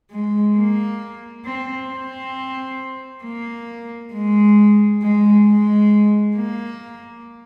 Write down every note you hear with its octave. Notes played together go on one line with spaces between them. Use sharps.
G#3
A#3
C4
C4
A#3
G#3
G#3
G#3
A#3